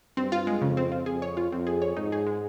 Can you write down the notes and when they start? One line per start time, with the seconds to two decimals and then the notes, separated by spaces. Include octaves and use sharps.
0.17 G2 C4
0.32 F4
0.47 G#3
0.62 F2 C#3
0.77 C4
0.92 F4
1.06 F2 G#4
1.22 C#5
1.37 F4
1.52 F2 C4
1.67 G#4
1.82 C#5
1.97 G#2 D#4
2.12 G#4
2.27 G#3